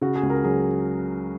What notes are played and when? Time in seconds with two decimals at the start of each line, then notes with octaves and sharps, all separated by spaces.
0.01 C#3 F#4
0.15 G#4
0.23 C#2
0.30 A#4
0.44 F#3 G#4